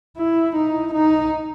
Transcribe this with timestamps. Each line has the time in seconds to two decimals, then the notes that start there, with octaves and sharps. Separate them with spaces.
0.18 E4
0.56 D#4
0.94 D#4